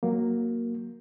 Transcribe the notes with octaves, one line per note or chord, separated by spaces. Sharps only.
F#3 A#3